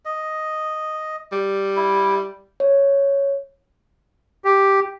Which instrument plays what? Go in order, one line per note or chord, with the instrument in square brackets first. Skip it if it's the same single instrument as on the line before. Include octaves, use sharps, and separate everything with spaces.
[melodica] D#5
[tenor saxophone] G3
[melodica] E4
[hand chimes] C#5
[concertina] G4